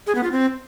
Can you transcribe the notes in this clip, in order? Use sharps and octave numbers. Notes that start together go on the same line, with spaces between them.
G#4
B3
F4
C4